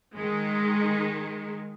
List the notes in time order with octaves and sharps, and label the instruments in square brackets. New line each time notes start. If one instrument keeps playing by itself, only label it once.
[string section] D#3 G#3